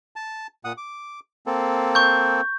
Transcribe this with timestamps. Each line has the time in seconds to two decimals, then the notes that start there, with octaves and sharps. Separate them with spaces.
0.16 A5
0.65 A#2 F#5 D#6
0.77 D6
1.46 A#3 C4 A4
1.95 C#6 G6